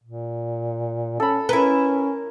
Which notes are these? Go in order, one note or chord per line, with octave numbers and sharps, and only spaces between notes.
A#2
C#4 A4 B5
C#4 E4 A#4 B4